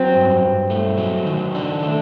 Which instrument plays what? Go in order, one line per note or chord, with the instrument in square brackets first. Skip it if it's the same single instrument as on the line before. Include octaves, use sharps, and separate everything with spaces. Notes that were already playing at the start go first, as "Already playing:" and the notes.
Already playing: [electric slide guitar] F#3 [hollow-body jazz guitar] C4
[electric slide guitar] G2
G2
A3
F#3
D#3
D4
A3